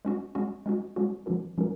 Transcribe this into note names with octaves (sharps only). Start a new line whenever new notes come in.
G#3 C#4 F#4
G#3 C#4 F#4
G#3 C#4 F#4
G#3 C#4 F#4
F3 G#3 C#4 F#4 A#4
F3 G#3 C#4 F#4 A#4